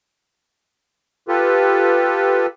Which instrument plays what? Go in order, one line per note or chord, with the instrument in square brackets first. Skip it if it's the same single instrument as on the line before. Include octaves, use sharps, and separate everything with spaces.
[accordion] F4 G4 A4 B4